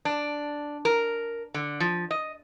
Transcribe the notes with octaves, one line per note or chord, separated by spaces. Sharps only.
D4
A#4
D3
F3
D#5